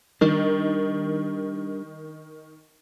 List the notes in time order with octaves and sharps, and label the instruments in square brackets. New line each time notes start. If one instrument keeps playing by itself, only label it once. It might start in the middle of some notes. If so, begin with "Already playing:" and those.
[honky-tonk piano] D#3 [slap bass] G3 D4